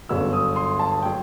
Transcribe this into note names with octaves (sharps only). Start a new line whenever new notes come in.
G1 F#2 F#3 B3 E6
D#6
C6
A5
F#3 G5